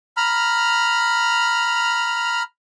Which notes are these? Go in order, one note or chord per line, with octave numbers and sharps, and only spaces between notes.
A#5 B5 F6